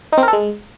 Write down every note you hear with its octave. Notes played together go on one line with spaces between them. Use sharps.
D#4
C4
A#4
A4
G#3